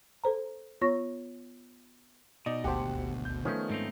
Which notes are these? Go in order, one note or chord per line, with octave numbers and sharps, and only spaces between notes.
A4 C5 A#5
B3 F4 C#5 C#6 A#6
B2 D#4 D5 D#5
G#1 D2 G4 C5 F#5 A5
G6
D#3 F3 A3 B3 C#4
G#2 C4 D#4